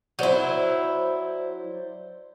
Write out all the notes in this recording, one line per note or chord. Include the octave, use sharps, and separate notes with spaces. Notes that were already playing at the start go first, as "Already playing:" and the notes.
F#3 E4 C5 D5 G6